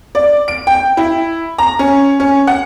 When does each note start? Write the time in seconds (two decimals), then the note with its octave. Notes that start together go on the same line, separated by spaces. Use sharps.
0.15 D5
0.48 D7
0.67 G5
0.97 E4
1.58 A#5
1.79 C#4
2.20 C#4
2.47 F#5